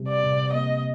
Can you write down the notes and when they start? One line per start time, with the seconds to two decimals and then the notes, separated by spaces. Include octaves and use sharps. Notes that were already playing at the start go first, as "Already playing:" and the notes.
Already playing: C3 G3
0.08 D5
0.23 C3
0.53 A#3 D#5